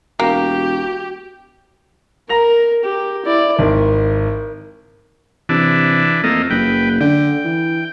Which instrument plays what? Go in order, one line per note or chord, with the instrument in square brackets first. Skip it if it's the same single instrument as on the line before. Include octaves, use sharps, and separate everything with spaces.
[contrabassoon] E1 [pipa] A#3 [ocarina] F#4 [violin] G4
[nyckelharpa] A#4 [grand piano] A#5 A#6 F7
[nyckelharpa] G4
E4 D5
[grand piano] G#1 [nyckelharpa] A#4
[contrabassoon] C3 [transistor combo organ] E3 D4
[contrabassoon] F2 [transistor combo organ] A3 A#3 D#5
[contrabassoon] F#1 [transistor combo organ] B4 G5
[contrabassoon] D3 [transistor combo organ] G5
[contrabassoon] E3